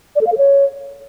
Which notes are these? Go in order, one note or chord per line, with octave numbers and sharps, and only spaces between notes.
D5
A4
F5
A4
C#5